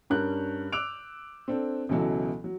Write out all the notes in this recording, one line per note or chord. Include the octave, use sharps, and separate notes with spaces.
G2 C#4 A#4 F#6 G6
D6 E6 F#6 D7 F7
C4 D4 A4
C#2 B2 E3 F#3 A4
F#3